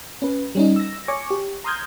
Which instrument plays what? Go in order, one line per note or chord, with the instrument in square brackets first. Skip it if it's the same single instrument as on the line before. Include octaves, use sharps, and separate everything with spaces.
[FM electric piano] C#4 B4
G3 C#4 D#4
E6 A#6
C#5 G#5 C#6 D6
G4
A#5 C6 D#6 F6 G6 G#6